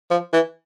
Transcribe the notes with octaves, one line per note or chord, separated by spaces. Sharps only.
F3
E3